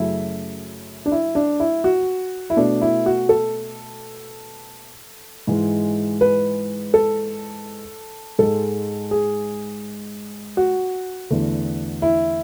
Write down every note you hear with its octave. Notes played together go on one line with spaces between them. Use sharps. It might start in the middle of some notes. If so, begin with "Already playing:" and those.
Already playing: F#2 C#3 F#3 A3 E4
D4
E4
D4
E4
F#4
E4
B2 A3 D4
E4
F#4
A4
G#2 E3 G#3
B4
A4
G#2 G#3 A4
G#4
F#4
E2 D3 A3
E4